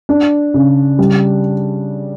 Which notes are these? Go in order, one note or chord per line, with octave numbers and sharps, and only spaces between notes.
D4
C#3
G3